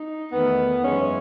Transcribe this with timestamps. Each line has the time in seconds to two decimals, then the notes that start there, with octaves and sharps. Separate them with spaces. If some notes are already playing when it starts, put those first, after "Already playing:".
Already playing: D#4
0.31 E2 D#3 A3 B3
0.83 F#2 E3 G#3 C#4